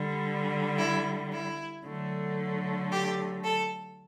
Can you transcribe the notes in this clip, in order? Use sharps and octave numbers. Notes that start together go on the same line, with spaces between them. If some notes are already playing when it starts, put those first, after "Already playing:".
Already playing: D3 G3
E4
E4
D3 F#3 A3
G4
A4